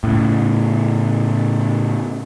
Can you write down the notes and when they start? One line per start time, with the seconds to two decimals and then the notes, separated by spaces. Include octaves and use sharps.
0.04 A2 C#3